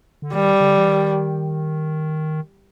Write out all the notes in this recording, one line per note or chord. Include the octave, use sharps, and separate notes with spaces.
D3
D#3 G3
D3
E3
D#3